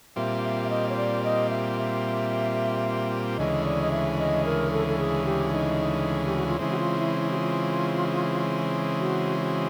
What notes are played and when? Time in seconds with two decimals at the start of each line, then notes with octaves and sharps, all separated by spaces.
0.16 A#2 G3 C4 F4 E5
0.44 E5
0.64 E5
0.70 D#5
0.89 C#5
0.97 D5
1.24 D#5
1.50 E5
1.77 E5
3.37 D2 C#3 E3 G#3 D#5
3.65 D5
3.82 D#5
3.91 E5
4.18 D#5
4.45 A#4
4.71 A4
4.87 A4
4.98 G#4
5.25 G4
5.52 D#4
6.25 G4
6.36 F#4
6.47 F4
6.59 C#3 E3 G#3 C4 E4
6.71 F#4
6.79 F4
6.99 E4
7.20 E4
7.31 F#4
7.39 F4
9.00 F#4
9.40 F#4